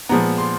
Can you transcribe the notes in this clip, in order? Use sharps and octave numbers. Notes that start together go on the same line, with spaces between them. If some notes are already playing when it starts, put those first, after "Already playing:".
A#2 F3 G#3 B3 A#5
C6